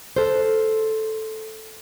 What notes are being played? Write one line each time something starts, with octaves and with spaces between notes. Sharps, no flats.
A4 C5